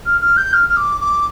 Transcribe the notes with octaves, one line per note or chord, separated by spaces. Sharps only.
F6
F6
G6
F6
F6
D6
D6